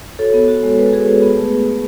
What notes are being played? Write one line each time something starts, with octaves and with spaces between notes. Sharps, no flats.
F#4 A4 C#5
B3
F#4
G#3
G#3 B4
A4
F#4 G#4 B4
G#3
B3
A3
A3
A3